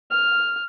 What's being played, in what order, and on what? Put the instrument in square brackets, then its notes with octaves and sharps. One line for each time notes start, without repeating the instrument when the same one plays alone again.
[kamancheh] F6